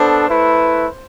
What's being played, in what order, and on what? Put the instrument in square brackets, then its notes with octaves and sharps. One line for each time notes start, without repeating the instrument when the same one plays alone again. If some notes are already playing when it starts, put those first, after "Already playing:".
Already playing: [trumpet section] B3 D4 A4 [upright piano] C5
[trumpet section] A3 E4 B4